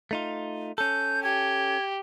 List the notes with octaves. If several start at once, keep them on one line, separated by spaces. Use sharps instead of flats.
A3 D#4 F4
C#4 A4 G6
G4 G#6